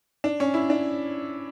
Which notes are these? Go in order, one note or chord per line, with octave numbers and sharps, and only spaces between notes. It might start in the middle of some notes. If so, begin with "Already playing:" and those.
D4
C#4
E4
D4